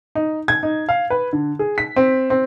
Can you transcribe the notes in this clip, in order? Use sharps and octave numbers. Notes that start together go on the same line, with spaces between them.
D#4
G#6
D#4
F5
B4
D3
G#4
B6
C4
C4